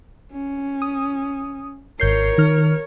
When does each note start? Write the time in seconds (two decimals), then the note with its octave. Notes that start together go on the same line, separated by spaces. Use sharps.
0.32 C#4
0.82 D#6
2.00 G#1 A#4 C#5 G6 C7
2.38 D#3 F6